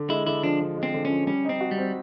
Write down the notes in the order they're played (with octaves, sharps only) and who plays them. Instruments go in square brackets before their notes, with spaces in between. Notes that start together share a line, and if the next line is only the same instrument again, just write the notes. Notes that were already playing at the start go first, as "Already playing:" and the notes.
Already playing: [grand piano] D3
[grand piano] G#3 [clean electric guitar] E4
[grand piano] D3 [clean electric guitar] E4
[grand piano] F3 [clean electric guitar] D4
[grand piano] D3
G#3
[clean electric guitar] C4
[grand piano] D3
[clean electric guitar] C#4
[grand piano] F3
[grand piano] G3 [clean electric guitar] C#4
[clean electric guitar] C4 [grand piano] D#4
[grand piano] F#4
[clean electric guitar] G3
[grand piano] C4